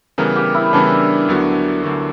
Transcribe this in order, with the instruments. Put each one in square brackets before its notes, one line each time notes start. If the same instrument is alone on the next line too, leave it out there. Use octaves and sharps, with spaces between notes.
[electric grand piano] C#3 E3 G3 B3 [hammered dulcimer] A#4
[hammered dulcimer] G4
E4
[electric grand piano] C#3 E3 G3 B3 [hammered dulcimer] D4
[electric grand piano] D2 D3 F#3 B3 F#4
D2 D3 F#3 B3 F#4